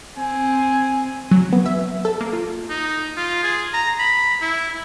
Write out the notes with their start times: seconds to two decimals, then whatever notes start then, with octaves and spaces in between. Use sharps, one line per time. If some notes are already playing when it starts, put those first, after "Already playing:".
0.18 C4 G#5
1.31 F#3
1.53 B3
1.66 E5
2.05 A4
2.21 A#3
2.33 F4
2.69 D#4
3.17 F4
3.43 G#4
3.74 A#5
3.99 B5
4.41 E4